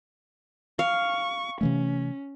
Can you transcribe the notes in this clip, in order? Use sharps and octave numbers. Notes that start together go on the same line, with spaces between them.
F5 C#6
C3 E3 A3 C#4